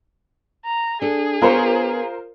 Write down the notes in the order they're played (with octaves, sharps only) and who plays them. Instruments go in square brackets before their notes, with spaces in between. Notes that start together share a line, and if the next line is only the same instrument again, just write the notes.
[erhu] A#5
[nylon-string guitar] D4 A4 [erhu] G#4
[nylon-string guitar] B3 C#5 [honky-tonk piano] F4 A#4 C5